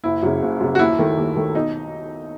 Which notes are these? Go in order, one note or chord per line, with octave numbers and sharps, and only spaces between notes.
F#1 E4
F#2 C#3
F#1
F#2 C#3
F#4
D#2 E4
D#3 A3
D#2
D#3 A3
B1 D#4